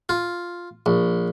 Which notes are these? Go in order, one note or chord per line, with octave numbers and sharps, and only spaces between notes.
F4
A#1